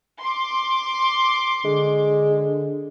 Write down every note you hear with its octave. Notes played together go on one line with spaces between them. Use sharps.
C6 D6
D3 G#3